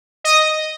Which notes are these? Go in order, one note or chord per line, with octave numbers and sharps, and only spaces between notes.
D#5